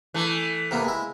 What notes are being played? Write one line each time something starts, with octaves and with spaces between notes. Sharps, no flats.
E3 A3
C3 A#3 B3
G#3 E4